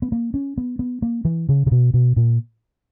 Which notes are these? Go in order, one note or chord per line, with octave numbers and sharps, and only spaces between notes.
B3
A#3
C#4
B3
B3
A#3
E3
C#3
C#3
B2
B2
A#2